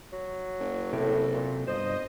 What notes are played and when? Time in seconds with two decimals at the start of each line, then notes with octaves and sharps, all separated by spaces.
0.13 F#3
0.60 F#1
0.93 A2 C3 F#3 G4 A4
1.34 A#2
1.68 G1 G2 C5 D#5